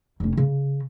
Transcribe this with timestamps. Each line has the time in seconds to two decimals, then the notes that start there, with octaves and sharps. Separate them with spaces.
0.20 F1 C#4
0.37 C#3